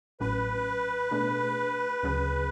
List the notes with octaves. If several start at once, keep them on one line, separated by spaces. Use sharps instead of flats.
A1 A2 F#3 C#4 B4
B2 A3 D4 G#4
D2 C#3 F#3 C#4 G#4